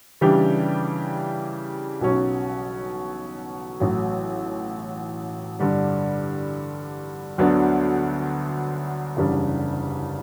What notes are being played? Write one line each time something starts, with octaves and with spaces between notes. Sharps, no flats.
C#3 E3 G3 D4 G4
B1 B2 F#3 C#4
A1 A2 F#3
G2 D3 G3
D2 D3 F#3 B3 D4
F#1 E2 C#3 G3 D4